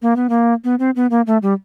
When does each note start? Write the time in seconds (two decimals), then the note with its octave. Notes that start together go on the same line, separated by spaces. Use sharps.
0.02 A#3
0.16 B3
0.29 A#3
0.64 B3
0.79 C4
0.96 B3
1.11 A#3
1.27 A3
1.43 G3